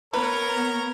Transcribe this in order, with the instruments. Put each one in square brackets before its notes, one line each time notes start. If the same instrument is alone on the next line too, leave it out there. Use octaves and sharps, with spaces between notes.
[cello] B3 [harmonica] A#4 C#5 A#5 [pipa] B4